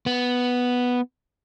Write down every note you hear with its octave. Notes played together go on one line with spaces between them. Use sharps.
B3